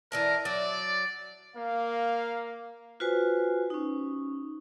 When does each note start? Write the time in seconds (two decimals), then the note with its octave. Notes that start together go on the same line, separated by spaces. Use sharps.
0.12 E3 A#4 D5 A5
0.45 F#3 D5
1.56 A#3 F5
3.00 F4 F#4 B4 C5 G#5
3.70 C#4 D#4